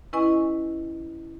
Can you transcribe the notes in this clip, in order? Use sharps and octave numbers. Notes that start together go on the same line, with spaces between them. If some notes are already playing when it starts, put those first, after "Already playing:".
C#4 E4 B4 D#5 G#5 C#6